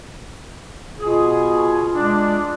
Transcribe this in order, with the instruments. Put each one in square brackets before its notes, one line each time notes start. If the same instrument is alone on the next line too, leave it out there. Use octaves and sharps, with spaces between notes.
[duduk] B2 [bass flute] F4 [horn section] G#4
[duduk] G#3 [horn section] D4